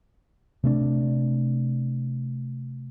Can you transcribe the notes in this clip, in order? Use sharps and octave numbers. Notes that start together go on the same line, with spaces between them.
C3 A3 D4